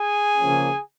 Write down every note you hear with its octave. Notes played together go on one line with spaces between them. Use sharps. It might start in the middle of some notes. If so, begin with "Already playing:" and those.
Already playing: G#4 G#5
C#3 F3 A#3 C#4